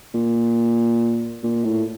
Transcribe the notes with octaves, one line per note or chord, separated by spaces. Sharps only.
A#2
A#2
A2